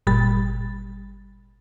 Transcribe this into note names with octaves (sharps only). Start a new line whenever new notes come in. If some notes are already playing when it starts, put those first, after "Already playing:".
G1 A#2 G3 B5 A6